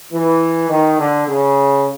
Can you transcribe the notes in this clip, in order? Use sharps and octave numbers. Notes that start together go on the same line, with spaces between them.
E3
D#3
D3
C#3